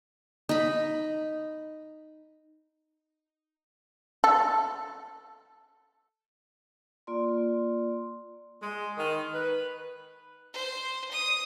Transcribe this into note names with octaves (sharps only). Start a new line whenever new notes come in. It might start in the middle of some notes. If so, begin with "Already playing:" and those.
D#4 B5
A4
A#3 F4 D5 C6
G#3
D#3
B4
C5
D#6